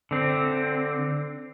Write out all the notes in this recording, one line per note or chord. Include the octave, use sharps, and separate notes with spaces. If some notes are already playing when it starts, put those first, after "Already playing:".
D3 C4